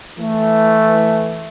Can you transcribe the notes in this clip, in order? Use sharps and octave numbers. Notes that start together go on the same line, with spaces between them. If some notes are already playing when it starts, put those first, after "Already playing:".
E3 A3